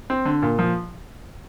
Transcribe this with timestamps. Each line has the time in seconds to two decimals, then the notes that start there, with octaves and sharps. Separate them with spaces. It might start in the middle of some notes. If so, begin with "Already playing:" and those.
0.10 C4
0.25 D3
0.42 A#2
0.59 F3